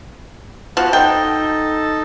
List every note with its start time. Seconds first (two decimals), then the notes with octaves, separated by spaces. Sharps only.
0.77 F3 B3 F#4
0.93 D#4 A4 G5